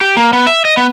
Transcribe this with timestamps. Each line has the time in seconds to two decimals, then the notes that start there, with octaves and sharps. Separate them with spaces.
0.01 G4
0.17 A#3
0.33 B3
0.47 E5
0.65 D#5
0.77 B3